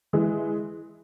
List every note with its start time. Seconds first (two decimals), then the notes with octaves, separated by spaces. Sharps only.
0.13 E3 G#3